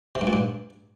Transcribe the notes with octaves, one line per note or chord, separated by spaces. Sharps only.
C3
G2
A#2
G2